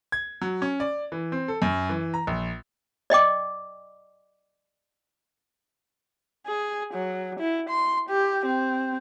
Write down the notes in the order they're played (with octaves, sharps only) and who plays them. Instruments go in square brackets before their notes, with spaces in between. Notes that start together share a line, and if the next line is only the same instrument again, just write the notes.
[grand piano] G#6
F#3
C#4
D5
E3
C4
A4
F#2
E3
A#5
A#1
[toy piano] D5 D#5 G5 D6
[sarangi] G#4
F#3
E4
C6
G4
C4